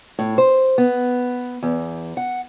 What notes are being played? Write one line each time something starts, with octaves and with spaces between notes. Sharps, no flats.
A2
C5
B3
E2
F#5